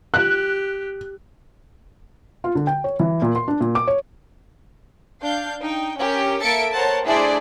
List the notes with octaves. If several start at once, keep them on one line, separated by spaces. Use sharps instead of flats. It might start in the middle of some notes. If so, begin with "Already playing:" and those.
G4 F#6
F4
D3
G5
C#5
E3
A#2
C6
D4
A#2
D6
C#5
D4 F5 G6
D#4 G5
C#4 G4 A#4
A#3 A4 E5 A6 C#7 D7
A#4 C5 C#5 F#5 A5
A3 D4 E4 G#4 C5 D5